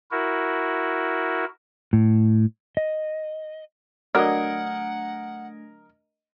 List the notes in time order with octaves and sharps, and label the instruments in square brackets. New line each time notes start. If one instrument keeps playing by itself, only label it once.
[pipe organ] E4 F#4 A#4
[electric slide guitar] A2
D#5
[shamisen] D3 F#3 [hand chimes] A3 D4 G#6 [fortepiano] A#4 D#5 [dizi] F#5